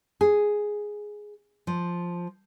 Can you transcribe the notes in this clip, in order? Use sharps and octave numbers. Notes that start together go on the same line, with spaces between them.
G#4
F3